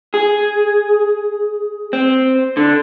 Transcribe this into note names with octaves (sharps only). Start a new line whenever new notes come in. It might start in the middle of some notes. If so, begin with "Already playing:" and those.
G#4
C4
D3